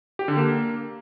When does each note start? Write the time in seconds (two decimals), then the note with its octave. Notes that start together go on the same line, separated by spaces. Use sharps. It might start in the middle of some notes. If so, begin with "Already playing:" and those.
0.19 G4
0.28 D3
0.37 A#3